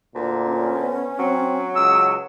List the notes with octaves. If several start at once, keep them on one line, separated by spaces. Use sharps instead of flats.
D2 A#2
C#4
B3
F#3 C4
C#2 E6